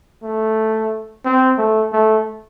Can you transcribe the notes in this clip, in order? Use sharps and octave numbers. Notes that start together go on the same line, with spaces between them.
A3
C4
A3
A3